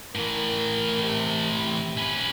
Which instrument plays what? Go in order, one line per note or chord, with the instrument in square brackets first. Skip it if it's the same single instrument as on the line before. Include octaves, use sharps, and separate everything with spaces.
[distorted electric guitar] A2 E3 [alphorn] A#4
[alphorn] C3
[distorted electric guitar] C#4 B4